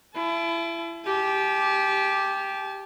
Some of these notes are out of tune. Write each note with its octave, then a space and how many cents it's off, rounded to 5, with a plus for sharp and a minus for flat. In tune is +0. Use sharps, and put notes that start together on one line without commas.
E4 +30 A5 -40
G4 +0 A5 -40